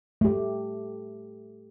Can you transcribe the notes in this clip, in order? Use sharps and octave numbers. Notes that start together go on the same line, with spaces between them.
A3 G4